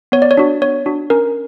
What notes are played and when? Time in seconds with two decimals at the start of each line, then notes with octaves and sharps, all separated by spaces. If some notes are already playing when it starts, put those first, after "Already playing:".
0.12 B3 C#5
0.22 D5
0.31 C#5
0.37 D4 F#4
0.61 B3 C#5
0.86 D4 F#4
1.10 C#4 A#4